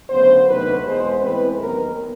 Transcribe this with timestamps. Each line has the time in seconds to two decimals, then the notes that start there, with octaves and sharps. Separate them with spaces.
0.10 D2 C#3 F#3 B3 C5
0.47 D2 C3 D#3 F#3 B4
0.84 E2 B2 G#3 C5
1.21 A2 E3 G#3 C4 B4
1.58 D#2 D#3 F#3 B3 A#4